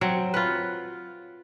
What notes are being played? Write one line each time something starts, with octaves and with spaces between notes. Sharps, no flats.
F#3 C4
F4 B4